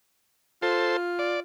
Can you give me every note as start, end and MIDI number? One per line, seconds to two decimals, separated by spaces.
0.62 1.41 65
0.62 0.97 69
0.62 0.97 72
1.19 1.40 74